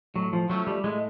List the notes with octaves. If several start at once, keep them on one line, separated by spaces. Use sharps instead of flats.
A2 F#3
F3
F3 F#3 A3 C#4
G3
A2 G#3